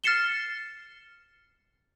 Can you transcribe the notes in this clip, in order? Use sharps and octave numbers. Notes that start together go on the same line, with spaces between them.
F6 A6 C7 C#7 E7 G7